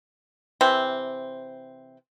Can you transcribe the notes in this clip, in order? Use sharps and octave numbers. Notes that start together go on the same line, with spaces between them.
C3 E3 C4